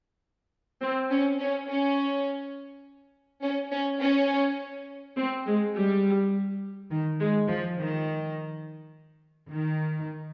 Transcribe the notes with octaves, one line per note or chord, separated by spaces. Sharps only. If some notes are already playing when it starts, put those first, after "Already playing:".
C4
C#4
C#4
C#4
C#4
C#4
C#4
C4
G#3
G3
D#3
G#3
F3
D#3
D#3